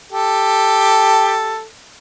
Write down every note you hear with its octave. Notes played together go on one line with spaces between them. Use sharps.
G4 A4